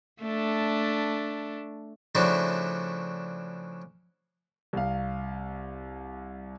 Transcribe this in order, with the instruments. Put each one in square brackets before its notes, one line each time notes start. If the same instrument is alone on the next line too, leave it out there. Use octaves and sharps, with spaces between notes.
[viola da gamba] A3 D4
[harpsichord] C#3 F3 A3 D4 E4 F#4
[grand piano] C2 F5